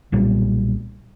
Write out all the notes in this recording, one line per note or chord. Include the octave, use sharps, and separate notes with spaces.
B1 A#2 G3